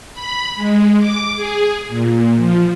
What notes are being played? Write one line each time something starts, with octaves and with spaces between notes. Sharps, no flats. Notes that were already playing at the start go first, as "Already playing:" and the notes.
B5
G#3
D6
G#4
A#2
F3